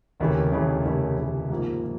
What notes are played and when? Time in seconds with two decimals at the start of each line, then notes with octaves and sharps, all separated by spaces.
0.20 F1 D#2 C#3 E3
0.52 F1 D#2 C#3 E3
0.85 F1 D#2 C#3 E3
1.17 F1 D#2 C#3 E3
1.50 G#2 F3 A#3
1.83 F3